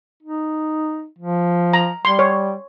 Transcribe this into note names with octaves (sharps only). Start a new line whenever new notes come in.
D#4
F3
A#5
G3 C6
C#5